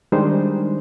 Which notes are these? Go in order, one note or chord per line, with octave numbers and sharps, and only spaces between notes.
D#3 G3 G#3 D4 D#4 C5